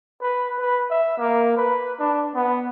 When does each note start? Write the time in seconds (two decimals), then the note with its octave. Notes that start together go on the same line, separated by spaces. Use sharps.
0.22 B4
0.59 B4
0.90 E5
1.18 A#3
1.57 B4
1.99 D4
2.35 B3